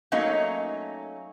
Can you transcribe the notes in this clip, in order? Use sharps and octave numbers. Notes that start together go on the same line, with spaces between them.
F#3 A3 A#3 C#4 D#4